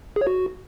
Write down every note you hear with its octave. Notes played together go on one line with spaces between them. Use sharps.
G#4
C#5
F#4